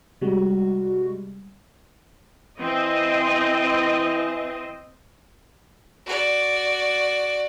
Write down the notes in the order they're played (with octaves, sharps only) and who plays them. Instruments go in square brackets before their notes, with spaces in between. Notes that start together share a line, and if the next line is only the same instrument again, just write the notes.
[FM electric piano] C3 G3 G#3 [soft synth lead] F#4
[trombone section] E3 [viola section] C4 D#5
[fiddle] F#4 D5